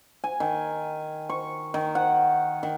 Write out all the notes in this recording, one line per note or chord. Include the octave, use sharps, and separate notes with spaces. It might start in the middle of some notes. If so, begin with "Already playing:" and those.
G#5
D#3
C#6
D#3
F#5
D#3